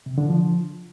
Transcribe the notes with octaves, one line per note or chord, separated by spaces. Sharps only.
C3
D3
F3